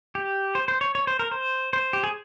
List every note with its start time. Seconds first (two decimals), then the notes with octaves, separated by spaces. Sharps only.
0.15 G4
0.55 C5
0.68 C5
0.81 C#5
0.95 C#5
1.07 C5
1.19 A#4
1.31 C5
1.73 C5
1.93 G4
2.04 G#4